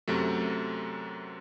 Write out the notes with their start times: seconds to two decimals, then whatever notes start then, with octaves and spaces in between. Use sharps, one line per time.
0.08 F#2 C3 F#3 A3